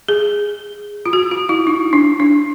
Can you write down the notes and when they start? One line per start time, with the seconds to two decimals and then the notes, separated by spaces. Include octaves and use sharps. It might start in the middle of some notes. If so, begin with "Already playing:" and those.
0.08 G#4
1.06 F4
1.13 F#4
1.31 F4
1.49 E4
1.67 D#4
1.93 D4
2.20 D4